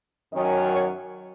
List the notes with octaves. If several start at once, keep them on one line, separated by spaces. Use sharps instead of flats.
F#2 D#3 F#3 C#4 D#5
C#5